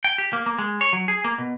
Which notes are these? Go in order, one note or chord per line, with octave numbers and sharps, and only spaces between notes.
G5
G4
A#3
A#3
G#3
C#5
F#3
G#4
A#3
B2